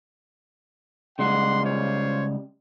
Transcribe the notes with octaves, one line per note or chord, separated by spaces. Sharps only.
C#3 G3 G#3 F#5 C6
F4 C5 C#5